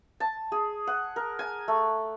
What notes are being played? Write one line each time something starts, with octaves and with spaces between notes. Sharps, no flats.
A5
G#4
F#5
A#4
G#5
A3